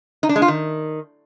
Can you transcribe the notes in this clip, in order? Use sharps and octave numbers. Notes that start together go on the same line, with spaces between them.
D#4
D4
G#3
F4
D#3